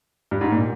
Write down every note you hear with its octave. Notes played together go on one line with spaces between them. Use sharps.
G2
G#2
A#2